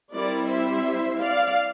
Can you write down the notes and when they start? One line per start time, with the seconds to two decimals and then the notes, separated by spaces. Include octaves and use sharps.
0.14 G3 C4 E4 A#4 D5
0.49 C5 E5
1.19 D5 F5